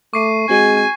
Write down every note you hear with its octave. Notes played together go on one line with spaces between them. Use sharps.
A3 C#6 D6 C7 D#7
G#3 C4 F#4 G#4 G#5